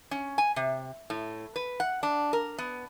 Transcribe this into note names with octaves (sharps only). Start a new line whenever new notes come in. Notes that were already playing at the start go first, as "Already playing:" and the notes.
C#4
G#5
C3
A2
B4
F#5
D4
A#4
B3